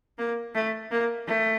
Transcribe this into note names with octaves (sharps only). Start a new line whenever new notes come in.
A#3
A3
A#3
A3